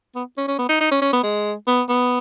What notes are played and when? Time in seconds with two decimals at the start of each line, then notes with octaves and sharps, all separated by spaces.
0.16 B3
0.38 C#4
0.48 C#4
0.59 B3
0.69 D#4
0.81 D#4
0.91 C#4
1.02 C#4
1.13 B3
1.23 G#3
1.67 B3
1.89 B3